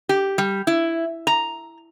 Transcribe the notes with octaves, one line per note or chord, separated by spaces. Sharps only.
G4
G3
E4
A#5